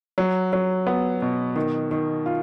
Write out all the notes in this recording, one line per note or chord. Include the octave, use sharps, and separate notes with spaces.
F#3
F#3
B3
B2
D#3
D#3
F4